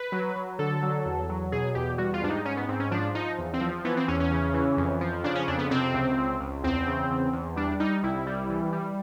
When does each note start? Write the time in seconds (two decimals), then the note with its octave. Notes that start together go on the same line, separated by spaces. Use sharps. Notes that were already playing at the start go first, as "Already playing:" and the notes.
Already playing: B4
0.12 F#3
0.36 F#3
0.59 D3 A4
0.82 F#3
1.06 E2
1.29 F#3
1.52 B2 G#4
1.75 E2 G4
1.98 G3 F#4
2.14 F4
2.22 G#2 D4
2.30 D#4
2.45 G#2 C#4
2.57 B3
2.69 G#2 C4
2.80 C#4
2.91 F3 D4
3.15 F3 D#4
3.38 E2
3.54 C4
3.61 F3
3.85 E3 B3
3.97 C4
4.08 E2 C#4
4.20 C#4
4.31 C#3
4.54 E3
4.77 F2
5.01 F3
5.24 C#3 D4
5.35 C#4
5.48 F2 D4
5.58 B3
5.71 C3 C4
5.94 C#2
6.18 C#2
6.40 C#2
6.63 E2 C4
6.87 C#3
7.10 E2
7.33 E2
7.56 G3 D4
7.80 G3 D#4
8.03 C2 E4
8.27 G3
8.50 E3
8.72 G3